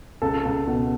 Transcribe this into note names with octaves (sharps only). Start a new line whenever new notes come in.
C#2 A4
C#2
B2